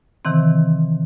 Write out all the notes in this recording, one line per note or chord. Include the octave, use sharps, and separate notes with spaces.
C3 D#3 E3 C4